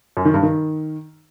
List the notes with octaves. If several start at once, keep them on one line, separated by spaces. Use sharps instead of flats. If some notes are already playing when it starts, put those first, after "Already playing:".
F#2
D#3
G2
D#3